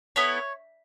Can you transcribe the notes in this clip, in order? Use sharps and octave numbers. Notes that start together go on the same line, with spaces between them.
B3 E4 A4 C#5